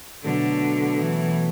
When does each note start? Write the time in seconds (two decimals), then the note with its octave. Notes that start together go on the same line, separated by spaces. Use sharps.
0.24 B2 D3 F#3 A3
0.99 E3